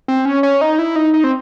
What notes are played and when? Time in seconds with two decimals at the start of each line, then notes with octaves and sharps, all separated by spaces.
0.08 C4
0.25 C#4
0.43 C#4
0.61 D#4
0.79 E4
0.96 D#4
1.14 D#4
1.24 C4